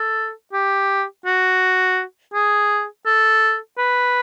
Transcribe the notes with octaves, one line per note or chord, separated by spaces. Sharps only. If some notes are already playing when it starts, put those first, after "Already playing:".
Already playing: A4
G4
F#4
G#4
A4
B4